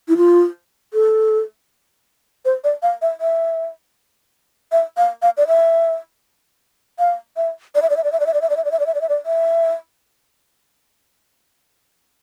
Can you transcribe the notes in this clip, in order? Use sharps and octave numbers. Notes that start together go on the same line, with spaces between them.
E4
F4
A4
C5
D5
F5
E5
E5
E5
F5
F5
D5
E5
F5
E5
D5
E5
D5
E5
D5
E5
D5
E5
D5
E5
D5
E5
D5
E5
D5
E5
D5
E5
D5
E5